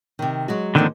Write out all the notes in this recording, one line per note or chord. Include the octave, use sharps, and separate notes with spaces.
C3 D#3
F#3 G#3 F#4
G#2 D3 D#3 F3 A#3 C4